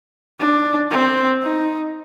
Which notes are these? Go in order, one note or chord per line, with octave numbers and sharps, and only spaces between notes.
D4
C4
D#4